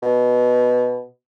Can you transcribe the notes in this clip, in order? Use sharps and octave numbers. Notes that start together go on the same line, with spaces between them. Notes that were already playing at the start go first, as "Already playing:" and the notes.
B2